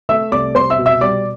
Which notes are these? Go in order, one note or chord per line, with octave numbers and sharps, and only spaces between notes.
A3 E5 E6
C2 D5 D6
C2 C5 C6
E5 E6
B2
E5 E6
G3 D5 D6